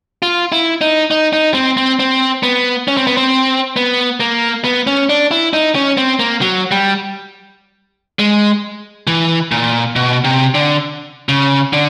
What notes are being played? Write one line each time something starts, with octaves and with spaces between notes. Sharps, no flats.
F4
E4
D#4
D#4
D#4
C4
C4
C4
B3
C#4
C4
B3
C4
B3
A#3
B3
C#4
D4
E4
D#4
C#4
C4
A#3
F#3
G3
G#3
E3
A#2
B2
C3
D3
C#3
D3